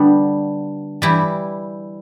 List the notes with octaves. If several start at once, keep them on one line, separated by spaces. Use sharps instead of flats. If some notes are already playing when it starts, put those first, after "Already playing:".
Already playing: D3 G3 B3 D4
E3 G3 E4 G4